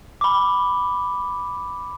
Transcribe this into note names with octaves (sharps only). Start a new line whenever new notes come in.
B5 D6